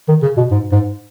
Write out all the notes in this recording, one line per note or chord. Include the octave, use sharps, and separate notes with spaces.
D#3
C#3
B2
G#2
G#2